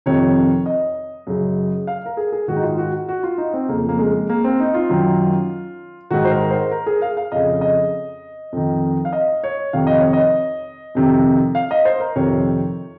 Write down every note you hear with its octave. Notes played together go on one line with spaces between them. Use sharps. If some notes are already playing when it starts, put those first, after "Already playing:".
F2 C3 D#3 C#5
D#5
F#2 C#3
F5
A#4
G#4
G#4
G#2 D#3 F#4
D#4
F4
F#4
F#4
F4
D#4
C4
F2 C#3 A#3
A#3
G#3
A#3
C4
D#4
F4
F#2 D#3
G#2 D#3 F#4
C5
A#4
C5
A#4
G#4
F5
F5
F2 C#3 D#5
D#5
F2 D#3
F5
D#5
C#5
F2 C3 D#3 F5
D#5
C#5
D#5
F2 C3 D#3
F5
D#5
C5
A#4
F2 C3 D#3 C#5